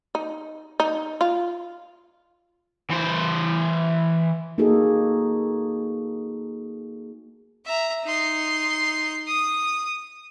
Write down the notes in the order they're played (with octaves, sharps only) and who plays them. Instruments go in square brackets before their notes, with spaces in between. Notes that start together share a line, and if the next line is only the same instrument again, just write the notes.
[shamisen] D#4
D#4
F4
[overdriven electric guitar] E3 C5
[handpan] A#3 D#4 F#4 G#4 A4
[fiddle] E5 A#5
D#4 C6
D#6